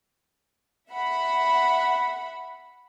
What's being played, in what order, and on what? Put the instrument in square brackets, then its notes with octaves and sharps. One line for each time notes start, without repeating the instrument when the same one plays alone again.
[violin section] E5 F#5 B5